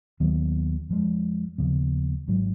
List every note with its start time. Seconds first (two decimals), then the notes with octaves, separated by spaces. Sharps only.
0.20 D#2 D#3 F#3 B3
0.89 F2 F3 G#3
1.58 D#2 C#3 F3 B3
2.27 G#1 G#2 F#3